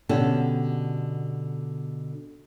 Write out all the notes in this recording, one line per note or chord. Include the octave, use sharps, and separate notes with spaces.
B2 D3 C#4 G4 A4